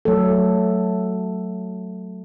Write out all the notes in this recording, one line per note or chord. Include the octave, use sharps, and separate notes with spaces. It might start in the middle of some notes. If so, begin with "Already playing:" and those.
F#3 A3 A4